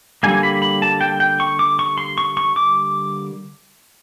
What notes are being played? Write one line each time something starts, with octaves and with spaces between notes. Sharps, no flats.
D3 G3 A#3 G#5
B5
B5
A5
G5
G5
C#6
D6
C#6
C6
C#6
C#6
D6